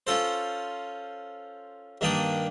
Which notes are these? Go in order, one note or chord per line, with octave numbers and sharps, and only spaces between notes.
C#4 F4 A4 C5
G2 D#3 A#3 D4 G4 D#6